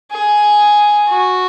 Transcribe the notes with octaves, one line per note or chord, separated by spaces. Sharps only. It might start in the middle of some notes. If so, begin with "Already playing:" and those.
G#4
F#4